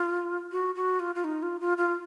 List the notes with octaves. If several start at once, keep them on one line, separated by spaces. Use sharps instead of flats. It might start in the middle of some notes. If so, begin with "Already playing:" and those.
Already playing: F4
F#4
F#4
F4
F4
D#4
F4
F4
F4